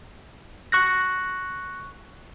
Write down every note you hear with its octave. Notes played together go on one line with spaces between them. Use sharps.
C#6 F#6 A#6